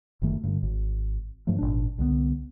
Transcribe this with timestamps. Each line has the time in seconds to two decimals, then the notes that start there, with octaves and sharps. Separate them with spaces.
0.22 F#1 F#2 D#3 A3
0.43 G2 D3
0.63 G#1
1.47 G2 F3 F#3 A3
1.59 G#1 A#2 D4
1.98 C2 D3 F#3 B3